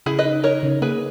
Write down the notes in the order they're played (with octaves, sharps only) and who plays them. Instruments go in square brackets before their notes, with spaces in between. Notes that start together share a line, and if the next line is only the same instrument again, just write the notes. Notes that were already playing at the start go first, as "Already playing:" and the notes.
[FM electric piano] C#3 [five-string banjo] E4 G#4
[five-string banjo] B4 D#5
[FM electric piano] D#4
[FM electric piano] D#4 [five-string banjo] A#4 C#5
[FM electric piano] C#3
[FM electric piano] A#3 [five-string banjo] G#4 B4